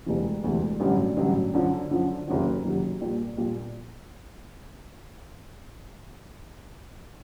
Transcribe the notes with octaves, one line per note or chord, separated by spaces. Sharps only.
E1 D2 C3 E3
E1 D2 C3 E3
A1 G2 D3 F#3
A1 G2 D3 F#3
F#2 D3 F3
F#2 D3 F3
F#1 F2 C3 D#3 F#3
F#1 F2 C3 D#3 F#3
A#1 A#2 G3 A#3
A#1 A#2 G3 A#3